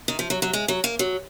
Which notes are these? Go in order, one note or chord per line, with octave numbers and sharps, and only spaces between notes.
D#3
F3
F#3
F#3
G#3
F#3
A#3
F#3